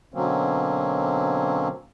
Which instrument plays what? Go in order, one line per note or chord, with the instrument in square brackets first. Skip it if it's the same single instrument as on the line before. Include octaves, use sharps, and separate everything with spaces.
[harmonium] B2 D3 F#3 A#3 C4 C#4